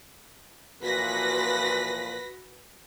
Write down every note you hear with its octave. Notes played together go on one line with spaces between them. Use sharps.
A#2 E3 F3 F#4 B4 A#6 B6